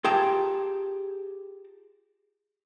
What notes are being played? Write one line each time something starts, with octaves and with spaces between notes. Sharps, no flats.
F4 G4 G#4 G5 A5 A#5